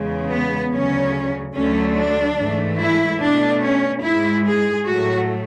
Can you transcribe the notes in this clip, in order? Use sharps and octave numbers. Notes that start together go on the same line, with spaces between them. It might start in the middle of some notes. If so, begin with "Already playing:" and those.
Already playing: E2 C#3 G#3
B3
D2 C#3 F#3 C#4
D2 D3 F#3 A3 C#4
D4
G#2 E3 A3
E4
B2 A3 D4
C#4
G#2 G#3 E4
G#4
A2 F#3 A3 F#4